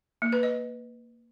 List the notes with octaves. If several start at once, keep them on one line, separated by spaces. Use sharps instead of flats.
A#3
B4
D#5